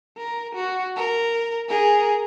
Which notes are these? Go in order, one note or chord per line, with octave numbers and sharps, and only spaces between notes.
A#4
F#4
A#4
G#4 A#4